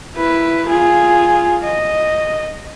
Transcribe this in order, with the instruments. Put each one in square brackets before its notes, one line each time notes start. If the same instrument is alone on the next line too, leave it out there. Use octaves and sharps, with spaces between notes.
[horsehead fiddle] E4 B4
F4 G#4
D#5